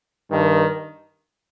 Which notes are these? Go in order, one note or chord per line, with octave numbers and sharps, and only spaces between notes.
G2 D#3